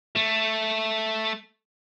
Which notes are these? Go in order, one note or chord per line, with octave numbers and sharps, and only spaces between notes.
A3